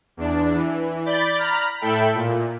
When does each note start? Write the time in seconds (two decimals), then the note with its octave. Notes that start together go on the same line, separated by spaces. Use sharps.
0.17 E2 D4
0.53 E3
1.05 D5 B5 G6 A6
1.38 A#5 B5 F6
1.81 A2 A4 E5 G5 B5
2.14 A#2